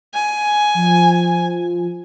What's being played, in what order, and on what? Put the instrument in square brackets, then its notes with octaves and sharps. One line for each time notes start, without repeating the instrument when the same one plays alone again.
[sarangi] G#5
[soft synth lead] F3